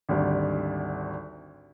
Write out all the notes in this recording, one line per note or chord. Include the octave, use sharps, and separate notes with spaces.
G#1 D2 G3